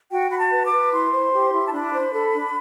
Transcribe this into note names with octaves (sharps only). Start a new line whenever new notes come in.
F#4 G5
F#4 B5
A5
B4
D6
B4
E4 C6
C5
G4
E4
A5
D4 B5
C5
A4
D4